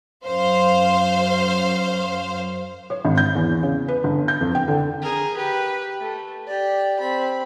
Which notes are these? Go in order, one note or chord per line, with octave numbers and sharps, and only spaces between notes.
F#2 C5 F5
C#5
G#1
G6
E2
C#3
B4
G1
G6
F2
G5
D3
G#4 A#4
G4 B4
A3
G4 D5
C4 B5